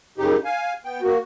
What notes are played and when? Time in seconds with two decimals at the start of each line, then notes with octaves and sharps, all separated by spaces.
0.18 F#2 C#3 D#4 G4
0.45 F5 G#5
0.85 B3 G5
1.02 A#3 F#4